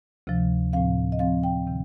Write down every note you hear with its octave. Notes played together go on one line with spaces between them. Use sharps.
D2 C3 F3
A2 F3 C4 F5
D#5
A2 F3 C4 F5
G5
C3 D#3